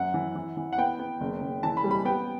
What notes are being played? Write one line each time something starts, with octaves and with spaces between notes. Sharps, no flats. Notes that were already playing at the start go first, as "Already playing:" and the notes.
Already playing: F#2 F#5
E3
E3
E3
F#5
B3 G5
B3
F#1
F#1
E3 A5
B5
G3
B5
B3 G5